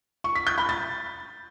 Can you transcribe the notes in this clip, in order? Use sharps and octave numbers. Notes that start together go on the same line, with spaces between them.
C#6
B6
G6
B5
A6